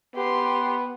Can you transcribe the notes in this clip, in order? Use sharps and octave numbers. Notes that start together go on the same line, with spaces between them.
B3 G4 C6